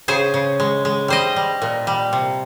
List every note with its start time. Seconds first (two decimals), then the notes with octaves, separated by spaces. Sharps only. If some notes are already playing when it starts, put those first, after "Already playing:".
0.08 C#3 G#4 C5
0.34 C#3
0.60 G#3
0.85 G#3
1.08 G3 C5 D#5
1.36 G3
1.62 A#2
1.87 G3
2.13 C3